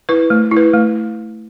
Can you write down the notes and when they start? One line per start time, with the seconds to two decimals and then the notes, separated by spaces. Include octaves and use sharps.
0.09 E4 B4
0.30 A3
0.51 E4
0.57 B4
0.74 A3